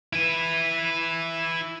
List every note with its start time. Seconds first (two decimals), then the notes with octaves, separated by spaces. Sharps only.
0.13 E4 B4